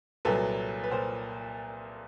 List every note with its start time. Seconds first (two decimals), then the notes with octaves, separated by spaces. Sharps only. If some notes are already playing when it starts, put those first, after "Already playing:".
0.25 C2 A#2 F#3 A4 B4
0.84 B4
0.90 A#2 A#4 C5